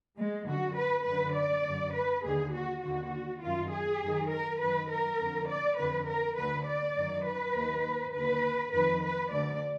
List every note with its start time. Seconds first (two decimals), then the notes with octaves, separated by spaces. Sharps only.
0.18 G#3
0.48 F#2 D3 F#4
0.77 B4
1.06 F#2 D3 B4
1.36 D5
1.65 F#2 D3
1.95 B4
2.25 D#2 D3 G#4
2.54 F#4
2.83 D#2 D3 F#4
3.42 F#2 D#3 F4
3.72 G#4
4.02 F#2 D#3
4.31 A#4
4.61 F#2 D#3 B4
4.90 A#4
5.20 F2 D3
5.50 D5
5.79 F2 D3 B4
6.08 A#4
6.37 D2 D3 B4
6.67 D5
6.97 F#2 D#3
7.26 B4
7.55 D#2 D#3
8.15 D#2 D3 B4
8.73 F2 D#3 B4
9.04 B4
9.32 D2 D3 D5